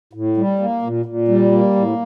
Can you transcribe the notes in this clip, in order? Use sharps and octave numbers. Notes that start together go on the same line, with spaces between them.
A2
G3
A#3
A#2
A#2
G3
A#3
A2